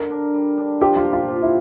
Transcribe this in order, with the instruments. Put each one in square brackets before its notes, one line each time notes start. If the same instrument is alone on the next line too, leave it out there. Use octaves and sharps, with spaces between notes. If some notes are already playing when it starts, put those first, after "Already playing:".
Already playing: [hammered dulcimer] D3 [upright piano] A#4
[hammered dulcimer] D4
G3
D4
[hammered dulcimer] F3 [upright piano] G4
[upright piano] F4
[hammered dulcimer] A#3
[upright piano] F4
[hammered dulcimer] F3
[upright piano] E4